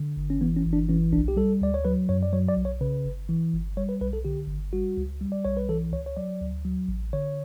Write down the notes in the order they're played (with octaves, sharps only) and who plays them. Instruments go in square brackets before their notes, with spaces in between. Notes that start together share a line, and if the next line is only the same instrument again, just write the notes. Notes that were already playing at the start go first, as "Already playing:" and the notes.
Already playing: [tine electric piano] D3
G1
C#4
E3 B3
C#4
G1
D4
E3 C#4
B1 D4
G4
G3 A4
D2 D5
C#5
F#3 B4
F#2 C#5
D5
F#3 C#5
D5
B1
C#5
C#3 B4
G1
E3
G1
G3 C#5
B4
B1 B4
A4
D3 G4
G1
G3 F#4
C#2
G3
D5
B1 C#5
B4
E3 A4
C#2 C#5
C#5
F#3 D5
D2
F#3
A1
D3 C#5